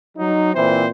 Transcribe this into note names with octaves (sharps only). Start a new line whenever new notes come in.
F#3 D#4
A#2 E3 C4 E4 C5